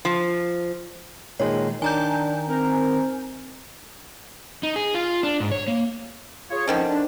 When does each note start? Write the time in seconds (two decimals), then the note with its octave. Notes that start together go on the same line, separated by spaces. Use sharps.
0.05 F3
1.40 A#2 D#3 G#3 C#5
1.82 D#3 D4 G#5 A#5 G6
2.49 C4 A#4
4.63 D#4
4.76 G#4
4.94 F4
5.23 D4
5.40 G#2
5.52 C#5
5.68 A#3
6.50 F4 G#4 C#5
6.68 D3 D#3 F3 C4 C#4
6.88 D4